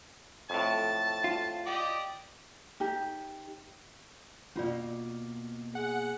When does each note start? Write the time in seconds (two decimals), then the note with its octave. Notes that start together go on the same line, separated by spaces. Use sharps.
0.50 F2 A2 A5
1.24 F4
1.66 G4 D5 D#5
2.80 D#4 G4
4.56 B2 A#3 C#4 F4 D5
5.75 G#4 F#5